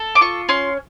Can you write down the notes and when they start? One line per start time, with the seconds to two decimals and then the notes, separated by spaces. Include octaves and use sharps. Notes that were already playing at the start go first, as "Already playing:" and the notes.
Already playing: A4
0.15 D6
0.21 F4 C#6
0.49 C#4 C6